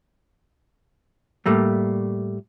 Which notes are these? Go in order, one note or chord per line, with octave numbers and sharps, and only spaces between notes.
A2 G3 A3 A#3